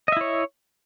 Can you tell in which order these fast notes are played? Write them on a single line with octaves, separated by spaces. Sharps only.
D#5 E5 E4 C#5